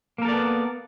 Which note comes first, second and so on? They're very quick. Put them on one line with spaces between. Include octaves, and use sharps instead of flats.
A#3 A#4 A4 D5 B3